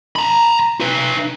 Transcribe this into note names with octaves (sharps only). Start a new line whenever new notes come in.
A#5 B5
D#4 B4